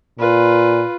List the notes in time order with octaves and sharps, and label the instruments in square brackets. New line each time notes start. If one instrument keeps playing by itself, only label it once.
[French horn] A#2 [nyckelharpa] F4 B4